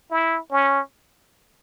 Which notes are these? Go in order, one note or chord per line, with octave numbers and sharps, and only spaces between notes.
E4
C#4